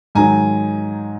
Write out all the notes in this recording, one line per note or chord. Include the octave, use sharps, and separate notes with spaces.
G#2 D#3 F#3 G#5 A#5